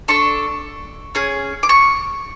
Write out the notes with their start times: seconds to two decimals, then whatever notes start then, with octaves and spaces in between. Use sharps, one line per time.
0.08 D4 A4 C#6
1.15 C#4 G#4
1.63 D6
1.69 C#6